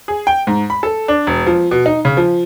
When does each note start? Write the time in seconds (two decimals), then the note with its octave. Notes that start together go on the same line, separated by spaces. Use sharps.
0.08 G#4
0.27 G5
0.47 G#2
0.70 B5
0.83 A4
1.08 D4
1.27 E1
1.46 F3
1.71 B2
1.86 D#4
2.05 C#3
2.17 F3